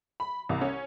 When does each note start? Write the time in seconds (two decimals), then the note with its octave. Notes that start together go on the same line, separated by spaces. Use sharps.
0.20 B5
0.49 C2
0.61 C#4